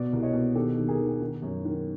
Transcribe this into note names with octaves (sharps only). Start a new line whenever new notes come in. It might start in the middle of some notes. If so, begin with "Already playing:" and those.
Already playing: B2 D5
C2
C#5 D#5
B2
D#3 G4 A4
D#2
G#4 A#4
D#3
D#3
F#2
D#3